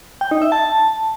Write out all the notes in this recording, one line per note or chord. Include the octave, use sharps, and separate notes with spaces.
G5
D#4
E5
A5
A5